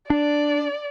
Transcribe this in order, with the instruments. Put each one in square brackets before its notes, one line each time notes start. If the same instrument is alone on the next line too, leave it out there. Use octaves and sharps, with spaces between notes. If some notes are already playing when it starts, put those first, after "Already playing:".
[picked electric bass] D4 [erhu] D5